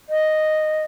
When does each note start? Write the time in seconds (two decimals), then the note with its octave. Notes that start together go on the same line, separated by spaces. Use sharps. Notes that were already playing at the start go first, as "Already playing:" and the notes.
0.09 D#5